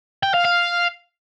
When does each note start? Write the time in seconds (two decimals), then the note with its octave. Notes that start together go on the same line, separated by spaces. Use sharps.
0.23 G5
0.34 F5
0.45 F5